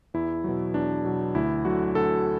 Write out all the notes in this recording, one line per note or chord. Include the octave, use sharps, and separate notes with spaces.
E2 E4
B2 F#3
E2 D4
B2 F#3
D2 E4
D3 F#3 F#4
D2 A4